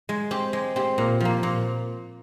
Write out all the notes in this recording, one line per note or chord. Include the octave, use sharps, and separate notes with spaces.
G#3
C4 G4
G#3
C4 G4
A#2
F3 A#3
A#2